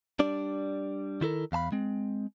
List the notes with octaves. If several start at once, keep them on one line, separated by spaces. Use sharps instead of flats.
G3 D4 D5
D#3 E4 A4 A#4
E2 F5 A5 B5
G#3 C4